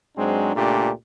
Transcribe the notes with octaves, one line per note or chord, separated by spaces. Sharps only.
G#2 F#3 G#3 C4 D4
C#2 A#2 A3 D4 G4